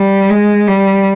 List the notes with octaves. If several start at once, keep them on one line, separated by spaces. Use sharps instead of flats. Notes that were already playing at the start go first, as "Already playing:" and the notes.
Already playing: G3
G#3
G3